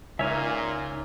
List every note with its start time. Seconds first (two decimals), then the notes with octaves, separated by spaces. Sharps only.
0.19 C#2 A#2 D#4 C#5 E5 G#5 F6